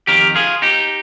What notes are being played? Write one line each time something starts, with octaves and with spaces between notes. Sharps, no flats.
F2 D#3 G4 A#4
F4 G#4
D#4 G4